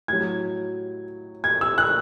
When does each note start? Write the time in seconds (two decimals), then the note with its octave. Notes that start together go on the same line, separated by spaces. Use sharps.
0.08 A2 F#3 G#6
1.44 G#6
1.61 E6
1.78 F#6